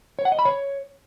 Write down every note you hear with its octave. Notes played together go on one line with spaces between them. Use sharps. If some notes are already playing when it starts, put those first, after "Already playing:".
C#5
F#5
D#5
B5
C#5